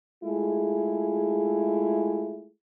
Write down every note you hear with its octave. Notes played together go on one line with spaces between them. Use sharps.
G#3 A3 E4 F4 G#4